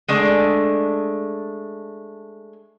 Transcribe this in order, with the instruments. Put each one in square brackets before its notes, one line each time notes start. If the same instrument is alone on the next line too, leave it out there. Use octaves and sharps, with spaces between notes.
[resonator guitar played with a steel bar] G#3 A3 D4